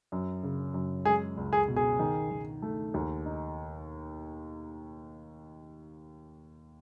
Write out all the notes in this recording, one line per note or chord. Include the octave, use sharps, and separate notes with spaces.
F#2
C#3
F#2
G#3 G#4
C#2
G#4
B2
G#4
D#3
D#3
A3
D#2
D#4